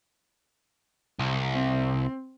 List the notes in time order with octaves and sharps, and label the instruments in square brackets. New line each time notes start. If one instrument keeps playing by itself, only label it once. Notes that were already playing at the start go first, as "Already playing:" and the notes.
[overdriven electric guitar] C2
[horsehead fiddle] C4